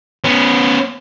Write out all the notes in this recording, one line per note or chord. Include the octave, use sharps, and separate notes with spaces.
B3 C#4